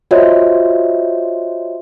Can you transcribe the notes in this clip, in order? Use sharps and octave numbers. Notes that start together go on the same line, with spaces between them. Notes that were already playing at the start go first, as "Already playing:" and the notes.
F4 F#4 C5 C#5 D#5 E5